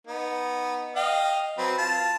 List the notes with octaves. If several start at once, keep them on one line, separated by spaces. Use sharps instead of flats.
B3 D#4
D#5 F5 G5
F#3 C4 B4
F4 A5